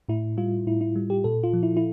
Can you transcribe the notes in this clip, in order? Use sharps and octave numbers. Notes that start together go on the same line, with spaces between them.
A2 E4
G3 F4
A2 E4
E4
G3
G4
A#2 A4
F4
F3
E4
E4